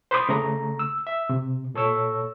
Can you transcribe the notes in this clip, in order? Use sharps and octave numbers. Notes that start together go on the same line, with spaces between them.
C5 B5 C6 D6 D#6
C#3 A3 A#5
E6
E5
C3
A#2 A4 C#5 E6